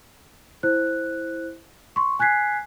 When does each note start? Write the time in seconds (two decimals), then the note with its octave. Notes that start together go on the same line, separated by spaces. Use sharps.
0.63 E4 C5 F#6
1.96 C6 C#6
2.19 G#5 F#6 G#6 B6 C7